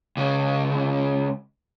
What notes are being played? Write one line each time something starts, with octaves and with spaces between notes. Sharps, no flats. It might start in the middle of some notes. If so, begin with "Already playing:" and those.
C#2 C#3